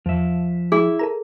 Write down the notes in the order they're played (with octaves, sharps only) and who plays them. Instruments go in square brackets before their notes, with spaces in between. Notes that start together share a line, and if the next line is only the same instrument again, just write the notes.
[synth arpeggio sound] E2 [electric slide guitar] F3 E5
[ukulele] E4 [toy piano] G#4
[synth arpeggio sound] A4 A#4 A#5